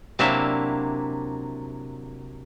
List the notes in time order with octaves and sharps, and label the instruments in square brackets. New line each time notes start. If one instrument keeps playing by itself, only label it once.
[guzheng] C3 F#3 A#3 D4 E4 E5